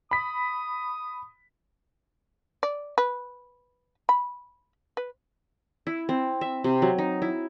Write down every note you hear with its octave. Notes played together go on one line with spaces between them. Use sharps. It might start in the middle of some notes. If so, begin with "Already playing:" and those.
B5 D#6 B6
D5
B4
B5
B4
E4
C4
E5
C3
F#3
D#4
E4